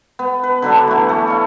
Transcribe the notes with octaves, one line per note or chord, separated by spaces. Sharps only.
B3
B4
D3 F#3 D4 A4
E3 A3
A3
C#5 F5